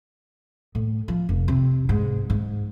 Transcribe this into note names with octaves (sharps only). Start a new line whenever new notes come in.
A2
F3
F1
C3
G#2
G#2